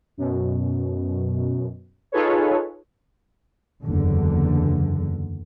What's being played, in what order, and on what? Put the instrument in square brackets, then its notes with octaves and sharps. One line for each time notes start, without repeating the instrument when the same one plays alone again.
[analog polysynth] F#2 B2
D#4 F4 G#4 A4 B4 C#5
[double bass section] F#1 E2 D3